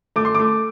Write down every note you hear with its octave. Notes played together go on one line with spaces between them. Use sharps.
A3 D6
C6
A3 D6